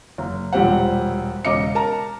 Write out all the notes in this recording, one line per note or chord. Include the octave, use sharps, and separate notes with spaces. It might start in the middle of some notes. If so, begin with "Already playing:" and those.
F#1
E1 A#1 G3 G4 C5 F#5
E1 C#3 D#5 D6 C#7
A#4 A5 A#5